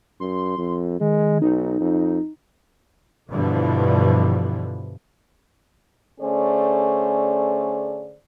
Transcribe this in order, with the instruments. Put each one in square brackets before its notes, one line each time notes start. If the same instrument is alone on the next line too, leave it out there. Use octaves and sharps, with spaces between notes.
[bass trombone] F#2 [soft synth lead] C6
[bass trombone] F2
[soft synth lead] D#3 [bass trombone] G#3
[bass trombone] B1 [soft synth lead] D#4
[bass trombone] F2
[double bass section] G2 B2 D3 E3 F3
[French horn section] D3 A3 C#4 G#4 C5 D5